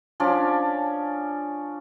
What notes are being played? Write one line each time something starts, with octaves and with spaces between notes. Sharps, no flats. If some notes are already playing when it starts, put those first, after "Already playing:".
F3 C#4 D4 D5